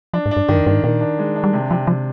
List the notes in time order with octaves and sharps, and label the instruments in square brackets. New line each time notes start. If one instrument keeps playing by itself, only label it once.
[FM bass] F3 [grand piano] D4
[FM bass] G#2
[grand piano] D4
[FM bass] G2
[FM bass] G2 [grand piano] D#3
[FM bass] F2
[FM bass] G2 [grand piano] D#3
[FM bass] G#2
[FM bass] A#2 [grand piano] D#3
[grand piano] D4
G#3
D4
[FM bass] G3
[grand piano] C3 [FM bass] G#3
[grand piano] C3 [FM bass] F3
[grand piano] C3 [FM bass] F3